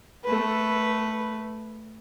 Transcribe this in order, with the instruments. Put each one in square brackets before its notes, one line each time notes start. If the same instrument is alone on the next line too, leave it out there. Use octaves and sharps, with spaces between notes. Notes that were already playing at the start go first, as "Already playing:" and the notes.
[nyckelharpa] A3 B4